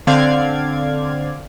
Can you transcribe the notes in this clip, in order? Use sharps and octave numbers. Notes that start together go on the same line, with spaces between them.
D3 C4 D5 F5 G#6